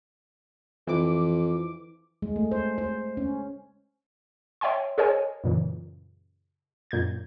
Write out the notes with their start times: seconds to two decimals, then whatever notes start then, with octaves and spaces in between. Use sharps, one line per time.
0.87 F2 E3 D6
2.22 G#3
2.36 A3
2.52 C5
2.78 C5
3.17 C#4
4.61 C#5 E5 G5 G#5 C6
4.98 G#4 A#4 C5 C#5 D#5 G#5
5.44 F#2 A#2 C#3 E3
6.91 F#2 A#2 G6 G#6